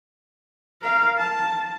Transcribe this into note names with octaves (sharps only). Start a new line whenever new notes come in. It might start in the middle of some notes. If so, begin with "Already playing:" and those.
A#4 F5
A5